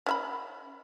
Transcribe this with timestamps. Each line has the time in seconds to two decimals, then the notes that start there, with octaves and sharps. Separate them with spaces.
0.06 C#4 E5 B5